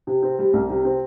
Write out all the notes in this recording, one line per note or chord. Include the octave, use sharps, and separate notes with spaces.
C3
C4
G3
C2
C3
C4